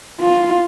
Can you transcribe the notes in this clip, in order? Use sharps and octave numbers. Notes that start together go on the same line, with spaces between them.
F4